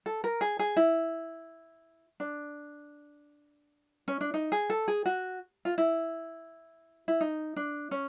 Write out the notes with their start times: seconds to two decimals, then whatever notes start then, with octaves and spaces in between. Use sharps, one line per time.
0.06 A4
0.24 A#4
0.41 G#4
0.59 G#4
0.76 E4
2.20 D4
4.08 C#4
4.21 D4
4.34 D#4
4.52 G#4
4.70 A4
4.88 G#4
5.06 F#4
5.65 F4
5.78 E4
7.08 E4
7.21 D#4
7.56 D4
7.91 C#4